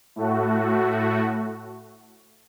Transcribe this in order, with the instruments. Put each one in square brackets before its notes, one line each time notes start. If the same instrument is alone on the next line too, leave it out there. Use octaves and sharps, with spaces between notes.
[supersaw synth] A2 A3 F#4